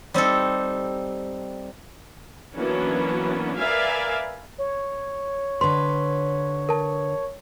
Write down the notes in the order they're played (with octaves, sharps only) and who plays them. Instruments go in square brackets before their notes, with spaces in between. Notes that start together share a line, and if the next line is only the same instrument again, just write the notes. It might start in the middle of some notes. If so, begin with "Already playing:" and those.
[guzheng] G3 C4 D#4 A4
[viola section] E3 F#3 A#3 B3 C#4 D4
A#4 B4 D5 E5 F5 G#5
[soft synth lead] C#5
[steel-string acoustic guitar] D3 B4 [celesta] C6
[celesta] A#4 A5